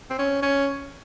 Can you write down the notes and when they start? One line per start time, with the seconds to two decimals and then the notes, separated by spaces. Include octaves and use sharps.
0.10 C4
0.18 C#4
0.42 C#4